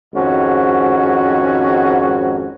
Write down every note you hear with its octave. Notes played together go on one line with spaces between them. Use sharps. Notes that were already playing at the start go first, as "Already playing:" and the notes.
G#1 F2 G#2 C#4 F#4